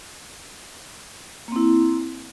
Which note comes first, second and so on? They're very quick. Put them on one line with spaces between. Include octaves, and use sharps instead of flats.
A#3 C4 E4